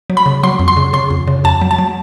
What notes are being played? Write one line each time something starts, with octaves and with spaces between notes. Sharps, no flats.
F#3
B5
C#3
F#3 C6
F2
C6
C#3
C#3 C6
F2
C#3
F2 A5
F#3
A5
F#3